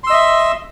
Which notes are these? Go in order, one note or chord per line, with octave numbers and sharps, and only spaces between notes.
D#5 E5 C6 E6